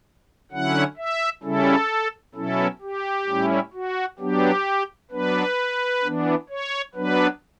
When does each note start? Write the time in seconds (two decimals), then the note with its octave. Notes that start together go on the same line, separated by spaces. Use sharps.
0.52 D3 F#3 C#4 E4 F#5
0.97 E5
1.43 C#3 G3 C#4 E4 A4
2.35 B2 F#3 C#4 E4 A4
2.81 G4
3.27 A2 G3 C#4 E4
3.73 F#4
4.19 F#3 B3 D4 G4
5.11 F#3 B3 D4 B4
6.03 E3 B3 D4
6.50 C#5
6.95 F#3 B3 D4 B4